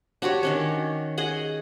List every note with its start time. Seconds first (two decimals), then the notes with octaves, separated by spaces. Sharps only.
0.22 D4 F#4 G4 C#5
0.43 D#3 C#4 C#5
1.18 G#4 D#5 F#5